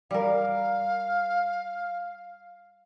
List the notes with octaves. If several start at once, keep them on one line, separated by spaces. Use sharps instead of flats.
G3 A#4 F5